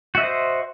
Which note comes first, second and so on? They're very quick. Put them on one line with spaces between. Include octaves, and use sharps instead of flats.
F#4 E5 D#5 C5